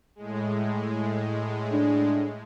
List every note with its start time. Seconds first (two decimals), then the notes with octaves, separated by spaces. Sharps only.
0.16 A2 G#3
1.72 D4